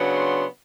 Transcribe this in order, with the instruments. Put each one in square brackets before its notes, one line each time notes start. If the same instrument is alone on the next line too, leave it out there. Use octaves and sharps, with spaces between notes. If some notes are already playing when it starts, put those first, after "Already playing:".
Already playing: [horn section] C#3 F#3 B3 D4
C6